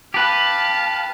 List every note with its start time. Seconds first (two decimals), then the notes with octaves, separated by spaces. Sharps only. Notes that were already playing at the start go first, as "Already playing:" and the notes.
0.14 G4 B4 F5 A5